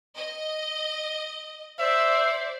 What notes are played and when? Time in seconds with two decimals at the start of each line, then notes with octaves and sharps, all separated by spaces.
0.16 D#5
1.79 C5 D5 E5